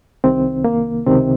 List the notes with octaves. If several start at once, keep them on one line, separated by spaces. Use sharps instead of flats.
C2 C3 D#3 C4
A#3
C#2 C3 D#3 C4